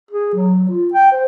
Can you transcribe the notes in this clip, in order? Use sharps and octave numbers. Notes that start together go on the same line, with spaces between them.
G#4
F#3
F4
G5
C5